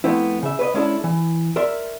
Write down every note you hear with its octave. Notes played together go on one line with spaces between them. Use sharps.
F3 A3 B3 C4 E4
C#3 E5
B4 C#5 D#5
G#3 C#4 D4 E4 F#4 A4
E3
A#4 D5 E5 C6